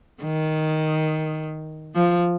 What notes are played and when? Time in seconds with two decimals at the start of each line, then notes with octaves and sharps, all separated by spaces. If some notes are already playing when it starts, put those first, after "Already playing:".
0.23 D#3
1.95 F3